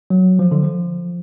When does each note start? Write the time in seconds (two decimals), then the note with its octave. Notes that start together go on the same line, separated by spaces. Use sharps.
0.10 F#3
0.39 F3
0.52 D3
0.63 F3